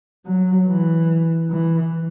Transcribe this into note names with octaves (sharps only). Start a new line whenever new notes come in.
F#3
E3
E3